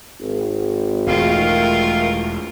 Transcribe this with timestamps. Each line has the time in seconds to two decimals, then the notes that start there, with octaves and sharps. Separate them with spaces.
0.21 G#1
1.07 E1 D#3 A3 F4 A#4 F5